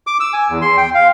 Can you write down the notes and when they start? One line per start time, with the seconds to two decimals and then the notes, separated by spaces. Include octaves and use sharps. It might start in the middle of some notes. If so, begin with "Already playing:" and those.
0.07 D6
0.20 E6
0.33 G#5
0.49 E2
0.62 C6
0.77 G5
0.95 F5